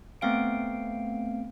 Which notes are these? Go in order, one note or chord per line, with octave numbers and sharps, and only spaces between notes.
A3 B3 C4 F5 G5 D7